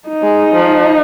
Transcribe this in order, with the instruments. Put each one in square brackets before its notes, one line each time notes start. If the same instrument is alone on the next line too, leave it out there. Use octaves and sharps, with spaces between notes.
[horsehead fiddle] D#4
[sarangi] G#3
F3